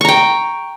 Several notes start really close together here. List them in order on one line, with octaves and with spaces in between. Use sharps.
C#6 A#5 G5